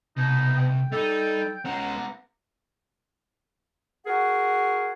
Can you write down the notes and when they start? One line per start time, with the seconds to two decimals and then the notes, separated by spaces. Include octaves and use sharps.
0.17 C2 B2 D#4
0.57 G5
0.92 G3 D#4 A4
1.65 G#3 B3 C#4 F#5 A#5
4.06 F#4 G#4 A#4 F#5